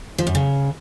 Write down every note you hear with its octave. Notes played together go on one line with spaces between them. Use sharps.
F3
F#2
C#3